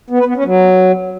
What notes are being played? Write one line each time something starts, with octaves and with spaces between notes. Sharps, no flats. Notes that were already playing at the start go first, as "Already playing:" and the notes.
B3
B4
B3
C#4
F#3